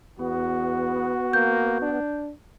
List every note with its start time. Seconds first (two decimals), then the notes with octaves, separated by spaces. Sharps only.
0.19 E2 B3 F#4
1.33 A#3 G6
1.82 D4